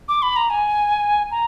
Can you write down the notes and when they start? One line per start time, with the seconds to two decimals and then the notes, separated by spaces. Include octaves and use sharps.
0.08 D6
0.22 B5
0.36 A#5
0.50 G#5
1.31 A#5